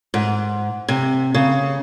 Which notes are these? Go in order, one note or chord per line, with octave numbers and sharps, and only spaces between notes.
G#2
C3
C#3